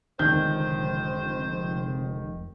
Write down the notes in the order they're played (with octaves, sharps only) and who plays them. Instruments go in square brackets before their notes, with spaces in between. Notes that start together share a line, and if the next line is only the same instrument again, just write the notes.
[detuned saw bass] F1 [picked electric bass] C#2 D3 G#3 [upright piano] D#3 G6 [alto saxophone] C5